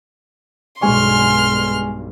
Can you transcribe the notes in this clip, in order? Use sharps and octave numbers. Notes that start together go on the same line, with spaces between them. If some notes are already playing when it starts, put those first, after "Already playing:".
B1 G2 G#3 G#5 C6 C#6 F6